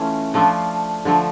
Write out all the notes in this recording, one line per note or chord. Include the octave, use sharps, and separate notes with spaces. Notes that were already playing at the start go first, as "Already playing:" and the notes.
Already playing: E3 A3 C#4 F4
F3 A3 D4 F4
D3 F3 A3